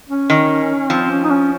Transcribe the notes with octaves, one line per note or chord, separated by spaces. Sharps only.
C#4
D#3
F3 C4
C#4
D#4
C#4